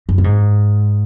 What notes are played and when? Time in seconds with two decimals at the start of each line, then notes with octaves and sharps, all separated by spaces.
0.09 F#2
0.18 A#2
0.24 G#2